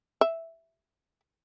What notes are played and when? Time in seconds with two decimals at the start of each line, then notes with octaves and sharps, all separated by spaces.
0.21 E5